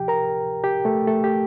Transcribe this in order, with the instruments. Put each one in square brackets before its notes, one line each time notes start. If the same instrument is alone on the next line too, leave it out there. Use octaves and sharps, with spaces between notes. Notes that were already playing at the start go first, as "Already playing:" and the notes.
Already playing: [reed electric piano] D2 C3 F3 G4 G5
A#4 A#5
G4 G5
A3 A4
A3 A4
G4